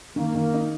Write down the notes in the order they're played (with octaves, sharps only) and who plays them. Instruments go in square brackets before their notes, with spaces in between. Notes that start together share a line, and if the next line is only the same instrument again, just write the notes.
[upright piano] D#3 [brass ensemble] A#3
[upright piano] D#3
D#4